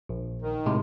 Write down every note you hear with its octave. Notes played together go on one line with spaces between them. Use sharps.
A#1
D#3
A2 C3 G#3